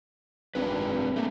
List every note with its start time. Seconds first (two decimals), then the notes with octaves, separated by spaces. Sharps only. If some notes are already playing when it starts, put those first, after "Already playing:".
0.55 G#1 G#3 D4 B4
1.16 A3 A#3